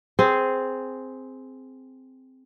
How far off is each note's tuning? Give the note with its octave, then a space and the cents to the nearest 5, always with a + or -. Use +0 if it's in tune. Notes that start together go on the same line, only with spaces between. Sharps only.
C4 -5 G#4 +5